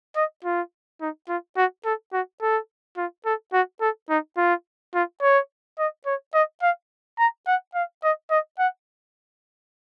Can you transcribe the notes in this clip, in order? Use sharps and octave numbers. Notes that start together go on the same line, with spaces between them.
D#5
F4
D#4
F4
F#4
A4
F#4
A4
F4
A4
F#4
A4
D#4
F4
F4
C#5
D#5
C#5
D#5
F5
A#5
F#5
F5
D#5
D#5
F#5